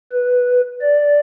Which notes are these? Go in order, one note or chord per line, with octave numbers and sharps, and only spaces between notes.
B4
D5